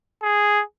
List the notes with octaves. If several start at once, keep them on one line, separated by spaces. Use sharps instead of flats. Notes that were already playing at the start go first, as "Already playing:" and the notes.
G#4